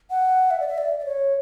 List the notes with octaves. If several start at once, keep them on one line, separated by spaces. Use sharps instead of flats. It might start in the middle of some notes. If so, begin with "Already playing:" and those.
F#5
E5
D5
E5
D5
D5
C#5